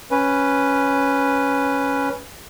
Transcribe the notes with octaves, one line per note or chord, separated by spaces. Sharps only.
C#4 B4